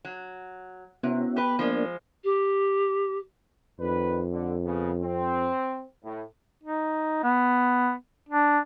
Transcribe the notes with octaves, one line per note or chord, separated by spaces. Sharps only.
F#3
C3 B3 C#4 E4 F#4
G4 B4
F3 G#3 A#3 D4
G4
F2 D#3 D4 B4
D3
C#3 B3
C4
A2
D#4
B3
D4